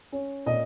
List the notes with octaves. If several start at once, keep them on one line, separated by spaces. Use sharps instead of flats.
C#4
A#2 D#5